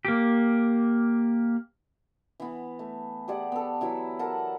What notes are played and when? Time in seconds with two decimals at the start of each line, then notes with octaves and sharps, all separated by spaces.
0.05 A#3 G4
2.40 E3 B3
2.79 A3
3.28 G4 G#4 D5 F#5
3.52 B3 A4
3.81 E3 F#3 E4
4.19 A4 A#4 F#5